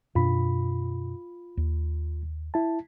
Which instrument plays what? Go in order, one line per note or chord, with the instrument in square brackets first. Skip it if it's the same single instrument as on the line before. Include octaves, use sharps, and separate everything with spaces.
[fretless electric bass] F#2 B2 D4 [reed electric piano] F4 B5
[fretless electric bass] D#2
[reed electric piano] E4 A5